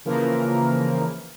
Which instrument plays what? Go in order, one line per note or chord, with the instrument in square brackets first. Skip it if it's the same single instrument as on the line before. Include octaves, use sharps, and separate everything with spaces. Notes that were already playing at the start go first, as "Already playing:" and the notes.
[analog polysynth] C#3 E3 F3 A#3 A#4